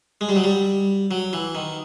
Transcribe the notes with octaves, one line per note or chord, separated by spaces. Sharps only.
G#3
G3
F#3
G3
F#3
E3
D#3